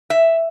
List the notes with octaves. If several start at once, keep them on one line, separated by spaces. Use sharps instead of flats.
E5